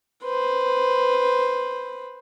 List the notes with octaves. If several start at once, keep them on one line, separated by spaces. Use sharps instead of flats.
B4 C5